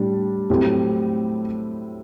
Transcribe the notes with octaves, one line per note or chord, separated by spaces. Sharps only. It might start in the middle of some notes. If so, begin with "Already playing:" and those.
Already playing: A2 G3 D4
A2 F#3 A3 C4 G4